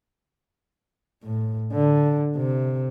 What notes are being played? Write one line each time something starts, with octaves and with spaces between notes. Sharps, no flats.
A2
D3
C3